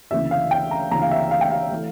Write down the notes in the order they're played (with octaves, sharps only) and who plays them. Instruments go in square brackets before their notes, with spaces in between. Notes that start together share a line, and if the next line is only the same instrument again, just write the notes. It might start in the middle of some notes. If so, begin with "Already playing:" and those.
[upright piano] D2 C#3 E3 A#3 E5
F5
G5
A#5
D2 C#3 E3 A#3 A#5
F5
E5
F5
G5
F5
E3 A3